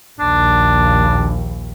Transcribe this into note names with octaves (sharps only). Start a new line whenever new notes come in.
A#1 D#2 D4